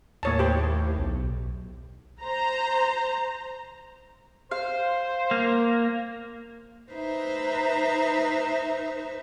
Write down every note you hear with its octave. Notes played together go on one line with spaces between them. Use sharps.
D#2 A2 A#3 C#5 A5
G4 C5
B1
C5 A#5
C5 F5
A#3
D#4 B4 C5 E5 A#5